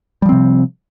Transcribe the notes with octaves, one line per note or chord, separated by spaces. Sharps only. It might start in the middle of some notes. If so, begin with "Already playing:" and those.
C3 F3 G3 C4